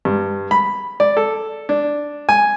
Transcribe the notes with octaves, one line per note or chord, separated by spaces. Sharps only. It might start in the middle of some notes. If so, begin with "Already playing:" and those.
G2
B5
D5
A4
D4
G#5